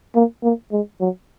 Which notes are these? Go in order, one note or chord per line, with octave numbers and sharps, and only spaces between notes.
A#3
A#3
G#3
F#3